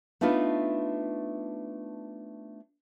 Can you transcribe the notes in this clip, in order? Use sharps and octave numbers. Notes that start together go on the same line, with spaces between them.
A3 B3 D4 D#4 F4 B4